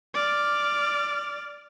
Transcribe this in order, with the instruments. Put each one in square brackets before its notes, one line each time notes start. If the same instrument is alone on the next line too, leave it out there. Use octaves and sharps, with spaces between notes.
[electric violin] D5 F6